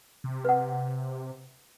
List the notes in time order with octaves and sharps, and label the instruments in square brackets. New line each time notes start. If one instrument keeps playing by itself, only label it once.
[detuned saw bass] C3
[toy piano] B4 F#5